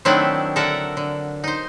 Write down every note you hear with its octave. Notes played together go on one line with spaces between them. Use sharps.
D#3 F#3 A3 C4 D4 E4
D3 A4 A#4 E5 F#5
D3
D#4 C5